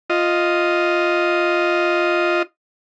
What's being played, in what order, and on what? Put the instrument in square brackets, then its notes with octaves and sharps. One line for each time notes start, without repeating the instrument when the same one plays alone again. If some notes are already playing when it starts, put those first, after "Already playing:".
[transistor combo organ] F4 D#5